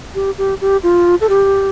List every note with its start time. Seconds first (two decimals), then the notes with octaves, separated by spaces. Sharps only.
0.15 G4
0.38 G4
0.61 G4
0.83 F4
1.21 A4
1.29 G4